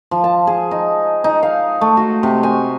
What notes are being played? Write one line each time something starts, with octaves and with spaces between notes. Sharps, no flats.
F3
A5
G#4
D#4
D#4
F5
A3
F#4
C3
G#5